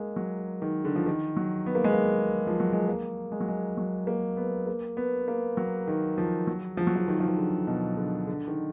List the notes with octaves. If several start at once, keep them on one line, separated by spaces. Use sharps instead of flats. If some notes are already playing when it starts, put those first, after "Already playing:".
Already playing: G#3 A#3
F#3
D#3
D3
F3
D#3
F#3
B3
A#3
G#3
A#3
F3
F#3
G#3
A#3
G#3
F#3
G#3
F#3
A#3
B3
A#3
B3
A#3
F#3
D#3
F3
F#3
F3
F#3
F3
D#3
F3
D#3
D3
B2
D3
D3
D#3